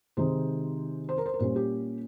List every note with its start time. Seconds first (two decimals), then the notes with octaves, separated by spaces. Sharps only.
0.17 C3 D#3 G#3 D#4 C5
1.09 C5
1.18 A#4
1.26 C5
1.34 A#4
1.39 A#2 G3 C#4 C5
1.56 G4